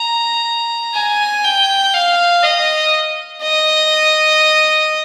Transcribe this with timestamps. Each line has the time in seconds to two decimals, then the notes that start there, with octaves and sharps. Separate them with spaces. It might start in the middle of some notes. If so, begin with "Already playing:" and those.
Already playing: A#5
0.94 G#5
1.44 G5
1.94 F5
2.43 D#5
3.42 D#5